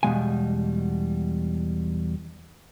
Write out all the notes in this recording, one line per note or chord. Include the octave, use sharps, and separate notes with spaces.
E2 B2 G3 G#3 F5 G#5